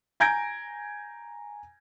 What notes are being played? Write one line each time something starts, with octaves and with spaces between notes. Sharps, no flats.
G#5 A#5 G6 G#6 A#6 D7